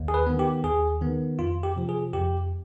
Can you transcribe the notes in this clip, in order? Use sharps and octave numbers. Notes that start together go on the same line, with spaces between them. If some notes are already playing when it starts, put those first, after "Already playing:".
Already playing: D#2
G#4
B4
D#3 B3
G4
D#2 G#4
D#3 B3
F2 F4
G4
C3 F3
G#4
F2 G4